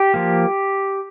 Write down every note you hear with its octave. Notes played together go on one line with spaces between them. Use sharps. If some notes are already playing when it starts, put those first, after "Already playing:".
Already playing: G4
F3 A#3